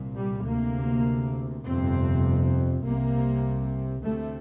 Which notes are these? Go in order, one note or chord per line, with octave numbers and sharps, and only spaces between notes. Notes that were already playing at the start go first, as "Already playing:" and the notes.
Already playing: C2 A#2
G3
D2 C3 A#3
G1 F2 C3 C4
C2 C3 A#3
D2 C3 A3